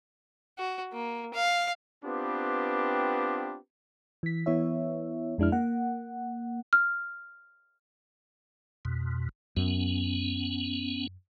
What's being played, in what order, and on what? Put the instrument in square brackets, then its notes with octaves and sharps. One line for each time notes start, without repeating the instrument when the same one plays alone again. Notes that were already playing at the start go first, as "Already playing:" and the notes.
[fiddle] F#4
A#3
F5
[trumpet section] B3 C4 D4 F4 G4 B4
[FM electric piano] E3 B6
E3 B3 E4 C#5 E5
F2 G#3 D4 E4 F6
A#3 F#5
[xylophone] F6
[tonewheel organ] F2 B2
[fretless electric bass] F#2 [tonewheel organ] B3 C#4